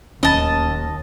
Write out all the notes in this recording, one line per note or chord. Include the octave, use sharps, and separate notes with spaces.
D1 D#2 D#3 C#4 D#5 A5